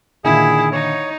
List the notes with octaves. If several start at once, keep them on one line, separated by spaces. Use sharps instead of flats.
A#2 D3 D#3 E4 G#4
D#4 C#5